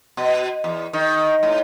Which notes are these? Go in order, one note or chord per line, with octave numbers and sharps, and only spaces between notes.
B2
E2
D#3
A2